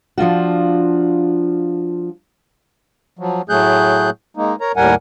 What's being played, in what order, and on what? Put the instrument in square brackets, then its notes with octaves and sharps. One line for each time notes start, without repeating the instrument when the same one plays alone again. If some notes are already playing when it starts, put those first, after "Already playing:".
[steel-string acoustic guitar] F3 D4 F4 F#4
[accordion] F3 F#3
A2 F#3 A3 G#4 F#6 G6
G#3 A#3 D#4
A#4 C#5 A#5
D#2 A2 G3 A#4 F#5 G#5